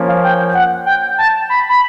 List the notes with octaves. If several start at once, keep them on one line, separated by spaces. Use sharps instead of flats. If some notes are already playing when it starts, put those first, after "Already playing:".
Already playing: F3 A#3 C#4
F5
G5
F#5
G5
A5
B5
B5